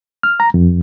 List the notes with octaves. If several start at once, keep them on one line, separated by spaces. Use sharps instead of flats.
F6
A#5
F2